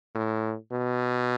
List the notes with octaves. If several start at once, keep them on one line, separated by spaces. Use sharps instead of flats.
A2
B2